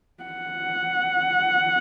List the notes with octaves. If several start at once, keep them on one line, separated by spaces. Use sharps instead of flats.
F#5